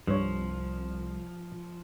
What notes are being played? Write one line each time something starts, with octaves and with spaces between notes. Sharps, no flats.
C2 G2 F3 C#5